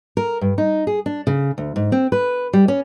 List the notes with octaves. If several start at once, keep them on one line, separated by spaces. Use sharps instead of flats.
A#4
G2
D#4
G#4
D4
C#3
D2
G#2
C4
B4
G3
C#4